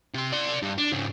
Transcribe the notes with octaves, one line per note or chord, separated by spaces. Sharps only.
C3 C6
D5 C6
G2
D4
G#2 C#3